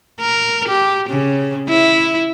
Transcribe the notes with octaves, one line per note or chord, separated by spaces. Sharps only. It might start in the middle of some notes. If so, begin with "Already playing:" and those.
A#4
G4
C#3
E4